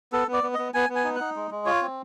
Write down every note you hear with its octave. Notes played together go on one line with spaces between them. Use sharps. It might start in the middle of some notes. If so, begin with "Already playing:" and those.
B3 A4
B3
D5
B3
B3 D#5
B3 G#5
B3
G#5
D#4
D#4 F#5
G#3
G#3
F4 C#5
C4